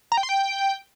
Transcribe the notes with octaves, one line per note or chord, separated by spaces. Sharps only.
A#5
G5
C6
G5